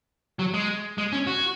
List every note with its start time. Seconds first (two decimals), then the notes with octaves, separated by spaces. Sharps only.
0.39 F#3
0.54 G#3
0.98 G#3
1.12 C#4
1.27 F#4